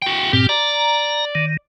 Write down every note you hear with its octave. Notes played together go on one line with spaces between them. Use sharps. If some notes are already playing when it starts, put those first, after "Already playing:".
F#4 G5
G2 A#2 C4 G4
D5 A#5
D#3